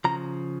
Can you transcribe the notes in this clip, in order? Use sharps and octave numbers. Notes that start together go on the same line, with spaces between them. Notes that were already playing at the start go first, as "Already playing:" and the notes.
C#3 F3 A#5